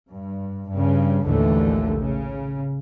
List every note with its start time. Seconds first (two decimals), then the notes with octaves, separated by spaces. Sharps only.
0.11 G2
0.70 G2 C#3
1.25 A#1 D#2 A2 D3 E3 A3
1.99 C#3